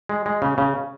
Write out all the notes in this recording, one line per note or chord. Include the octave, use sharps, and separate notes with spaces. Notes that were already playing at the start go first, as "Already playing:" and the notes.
G#3
G#3
C#3
C#3